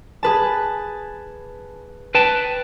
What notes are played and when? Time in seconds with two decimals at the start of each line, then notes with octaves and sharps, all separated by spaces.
0.23 G#4 B4 A5
2.15 B4 G5 A5